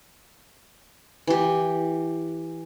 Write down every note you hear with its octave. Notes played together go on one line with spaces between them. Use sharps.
E3 G4